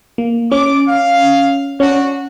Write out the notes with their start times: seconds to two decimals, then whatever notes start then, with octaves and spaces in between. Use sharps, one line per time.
0.18 A#3
0.52 C#4 D6
0.88 F5
1.80 C#4 D4 F#4